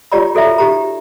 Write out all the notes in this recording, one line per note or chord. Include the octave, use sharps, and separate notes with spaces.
F4 G4 C#5 D5 A#5 B5
F#4 A4 D5 E5 A#5
D#4 G4 A#5